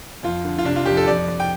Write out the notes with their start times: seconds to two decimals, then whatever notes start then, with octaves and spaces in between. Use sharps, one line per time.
0.23 F2 F4
0.45 D3
0.58 F4
0.65 C3 D4
0.76 F4
0.86 F2 G4
0.97 A4
1.07 F2 D5
1.28 F2
1.40 G5